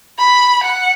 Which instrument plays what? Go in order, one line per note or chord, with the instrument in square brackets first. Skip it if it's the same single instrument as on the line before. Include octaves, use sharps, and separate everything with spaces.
[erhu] B5
F#5